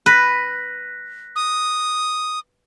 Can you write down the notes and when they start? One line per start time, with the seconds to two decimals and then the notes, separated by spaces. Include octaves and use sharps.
0.06 B4 F#6 A#6 B6
1.36 D#6